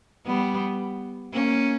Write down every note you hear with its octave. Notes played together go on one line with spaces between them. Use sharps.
G3 B3
A#3 C#4